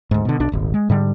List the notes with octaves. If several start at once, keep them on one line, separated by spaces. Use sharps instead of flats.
D2 G#2
B2 D3
B1 D4
D#1 G#1
G#3
G#2 D3 G3